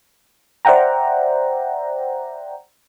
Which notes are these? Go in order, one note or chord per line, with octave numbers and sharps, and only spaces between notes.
C5 D5 E5 F#5 G5 A#5